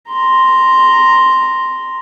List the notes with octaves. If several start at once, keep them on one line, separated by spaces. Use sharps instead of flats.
A#5 C6